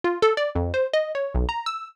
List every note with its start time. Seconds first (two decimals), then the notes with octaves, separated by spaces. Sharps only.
0.04 F4
0.22 A4
0.37 D5
0.55 F2
0.74 C5
0.94 D#5
1.15 C#5
1.35 B1
1.49 A#5
1.66 E6